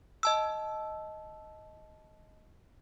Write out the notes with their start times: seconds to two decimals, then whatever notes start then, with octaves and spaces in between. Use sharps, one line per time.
0.23 D#5 A5 E6